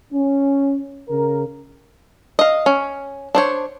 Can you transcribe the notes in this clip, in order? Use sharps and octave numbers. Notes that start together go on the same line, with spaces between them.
C#4
C#3 A#4
D#5 F5
C#4
D4 C5 C#5